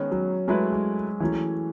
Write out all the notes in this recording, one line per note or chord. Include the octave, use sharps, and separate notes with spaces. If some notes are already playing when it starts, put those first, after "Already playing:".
Already playing: D#3 G#3 B3 C#4 D#4
F#3
F#3 G#3 A3 E4 B4
G#3
E3 F#3 A3 C#4 G#4